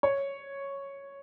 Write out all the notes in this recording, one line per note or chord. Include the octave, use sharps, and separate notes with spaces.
C#5